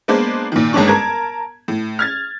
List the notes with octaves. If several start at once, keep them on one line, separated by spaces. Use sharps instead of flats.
G#3 A#3 B3 D4 B4 C5
A#2 D#3
G1 D#2 G#2 C#4 D4 C#6
A#4 A5 G#6
A2
F6 G#6 A6